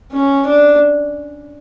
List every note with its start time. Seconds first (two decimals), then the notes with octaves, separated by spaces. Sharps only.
0.12 C#4
0.47 D4